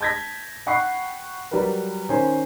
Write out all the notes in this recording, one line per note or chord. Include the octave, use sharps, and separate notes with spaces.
A5 G6 G#6 A#6 B6
F#5 G5 B5 C#6 F#6 C7
F#3 G3 G4 A#4 B4
D#3 C#4 C5 G#5